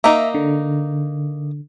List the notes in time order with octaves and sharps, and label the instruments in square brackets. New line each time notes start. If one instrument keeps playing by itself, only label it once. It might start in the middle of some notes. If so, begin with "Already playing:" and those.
[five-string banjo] A#3 D#4 [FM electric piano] E5
[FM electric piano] D3